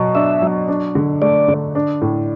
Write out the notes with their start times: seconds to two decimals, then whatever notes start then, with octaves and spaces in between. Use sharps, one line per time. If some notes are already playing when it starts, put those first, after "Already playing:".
Already playing: B2 F#3
0.15 D4 E5
0.42 F#3
0.68 D4
0.95 D3
1.21 A3 D5
1.48 D3
1.75 D4
2.01 A2